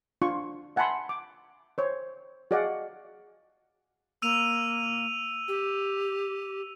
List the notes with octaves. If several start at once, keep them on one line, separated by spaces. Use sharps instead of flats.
D4 F4 C6 C#6
E5 F#5 G#5 A5 B5 C6
D6
C5 C#5
F#4 G#4 D5 D#5 F5 F#5
A#3 E6 D#7 F7
G4